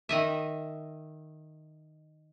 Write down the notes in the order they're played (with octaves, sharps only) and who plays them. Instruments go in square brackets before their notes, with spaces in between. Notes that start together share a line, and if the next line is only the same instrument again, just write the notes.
[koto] D#3 D#5 E5